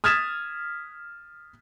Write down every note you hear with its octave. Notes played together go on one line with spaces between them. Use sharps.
D#6 F6 G#6 A6 B6 E7